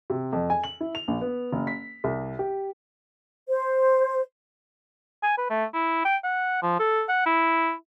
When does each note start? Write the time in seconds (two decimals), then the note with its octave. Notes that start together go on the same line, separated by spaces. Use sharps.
0.10 C3
0.33 F2
0.50 G#5
0.64 F#7
0.81 E4
0.95 F7
1.08 A#1
1.21 B3
1.52 F#1
1.67 B6
2.04 C2
2.39 G4
3.48 C5
5.23 G#5
5.38 B4
5.50 A3
5.74 E4
6.05 G5
6.24 F#5
6.62 F3
6.79 A4
7.09 F#5
7.26 E4